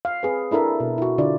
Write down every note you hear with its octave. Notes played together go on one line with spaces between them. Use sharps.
F5
C4 G#4 B4
D4 E4 A4 A#4 E5
B2
E4 F#4
D3 D4 E4 F4 D5